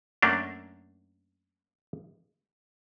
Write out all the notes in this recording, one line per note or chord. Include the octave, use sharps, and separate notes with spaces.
F#2 A3 A#3 D4